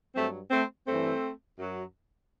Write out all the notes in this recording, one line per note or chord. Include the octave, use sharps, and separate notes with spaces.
G2 F#3 A3 C4
A3 C4
G2 E3 A3 C4
F#2 F#3